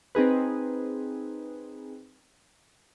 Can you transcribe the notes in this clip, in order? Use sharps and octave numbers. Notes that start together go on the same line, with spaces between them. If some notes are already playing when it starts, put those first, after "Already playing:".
C4 D#4 G#4 B4